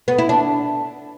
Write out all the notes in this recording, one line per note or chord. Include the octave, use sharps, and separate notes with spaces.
B3
E4
D4